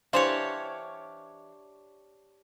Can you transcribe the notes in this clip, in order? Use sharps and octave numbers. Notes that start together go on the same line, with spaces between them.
E3 D4 G4 C5 C#5 F5